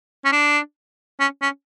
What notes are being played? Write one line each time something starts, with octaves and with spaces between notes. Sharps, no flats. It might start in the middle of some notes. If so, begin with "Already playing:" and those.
C#4
D4
C#4
C#4